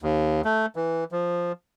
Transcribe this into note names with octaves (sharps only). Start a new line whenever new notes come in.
D#2
A3
E3
F3